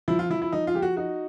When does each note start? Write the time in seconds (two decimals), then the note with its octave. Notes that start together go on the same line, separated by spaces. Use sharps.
0.08 F3 E4
0.19 F4
0.30 F3 E4
0.42 E4
0.52 F3 D#4
0.67 F4
0.75 F3 G4
0.82 F#4
0.97 D#4 F#4